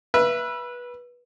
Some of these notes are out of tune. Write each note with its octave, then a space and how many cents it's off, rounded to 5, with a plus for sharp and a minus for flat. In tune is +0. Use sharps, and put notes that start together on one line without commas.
B4 -20 E5 +20